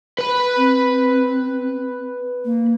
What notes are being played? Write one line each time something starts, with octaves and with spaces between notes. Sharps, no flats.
B4 B5
C4
A#3